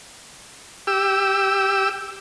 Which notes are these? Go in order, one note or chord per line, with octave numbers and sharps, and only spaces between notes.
G4 E6